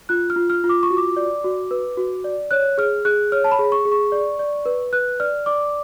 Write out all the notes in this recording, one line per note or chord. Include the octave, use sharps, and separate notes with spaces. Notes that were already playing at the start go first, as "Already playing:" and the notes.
F4 F#6
F6
F4
F6
F4
D6
C#6
F#4
D6
D5
F#4
B4
F#4
D5
C#5 F#6
G#4 F6
G#4 F#6
C#5 F6
A5
B5
G#4
C#6
G#4
C#6
D5
D5
B4
B4 F#6
D5 F6
D5 D6